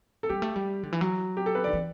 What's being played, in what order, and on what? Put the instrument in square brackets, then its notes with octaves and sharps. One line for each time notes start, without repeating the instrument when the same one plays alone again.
[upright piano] A4
[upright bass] G3 [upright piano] G4
[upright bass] A3
G3
D3
E3
F#3
[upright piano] G4
A4
B4
[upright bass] D3 [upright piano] D5
[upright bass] E3